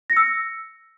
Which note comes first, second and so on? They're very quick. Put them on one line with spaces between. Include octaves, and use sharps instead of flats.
A#6 C#7 E6